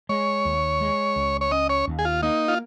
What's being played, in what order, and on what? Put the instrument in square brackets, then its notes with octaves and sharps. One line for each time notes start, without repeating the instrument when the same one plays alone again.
[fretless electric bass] G#3 [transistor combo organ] C#5
[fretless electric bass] D#2
G#3
C#2
[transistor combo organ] C#5
[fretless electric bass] C#4 [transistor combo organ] D#5
[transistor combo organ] C#5
[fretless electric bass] D#2
[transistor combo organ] G#4
F4
[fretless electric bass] A#3 [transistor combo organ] D#4
[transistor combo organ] F4